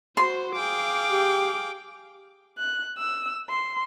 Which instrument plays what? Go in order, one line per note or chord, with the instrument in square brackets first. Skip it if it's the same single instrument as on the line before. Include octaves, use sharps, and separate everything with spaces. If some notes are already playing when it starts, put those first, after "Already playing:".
[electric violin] F#4 C5 [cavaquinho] C6
[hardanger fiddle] G#4 G5 [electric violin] F5 D6
[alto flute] G4
[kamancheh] F#6
E6
C6